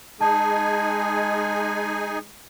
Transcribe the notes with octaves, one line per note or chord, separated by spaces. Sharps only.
G#3 D#4 G#4 G#5 A5